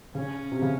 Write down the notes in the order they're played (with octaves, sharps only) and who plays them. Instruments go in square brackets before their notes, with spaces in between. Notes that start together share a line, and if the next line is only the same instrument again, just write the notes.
[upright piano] C#3 [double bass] C#4
[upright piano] C3
C#3